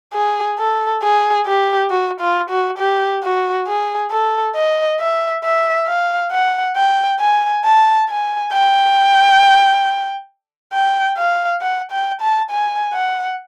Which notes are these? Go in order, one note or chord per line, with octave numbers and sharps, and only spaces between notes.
G#4
A4
G#4
G4
F#4
F4
F#4
G4
F#4
G#4
A4
D#5
E5
E5
F5
F#5
G5
G#5
A5
G#5
G5
G5
F5
F#5
G5
A5
G#5
F#5